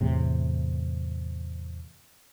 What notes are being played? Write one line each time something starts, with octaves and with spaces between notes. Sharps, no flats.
E2 A2 C3